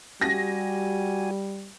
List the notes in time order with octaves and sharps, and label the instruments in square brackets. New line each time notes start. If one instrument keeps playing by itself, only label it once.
[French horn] G3 [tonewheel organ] F#4 G4 G#5 [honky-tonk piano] A#6